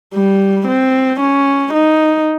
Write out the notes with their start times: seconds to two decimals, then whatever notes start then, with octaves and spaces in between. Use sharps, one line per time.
0.14 G3
0.68 C4
1.20 C#4
1.74 D#4